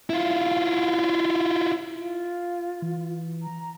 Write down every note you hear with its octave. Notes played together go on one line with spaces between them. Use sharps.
E4 F4
F4
E3
A#5